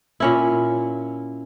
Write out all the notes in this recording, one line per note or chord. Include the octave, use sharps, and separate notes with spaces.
A#2 C#4 E4